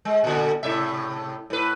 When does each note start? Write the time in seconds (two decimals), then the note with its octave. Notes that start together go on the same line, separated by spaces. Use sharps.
0.05 G#3
0.24 A#2 D3
0.63 A2 C3 E5
1.50 A2 B4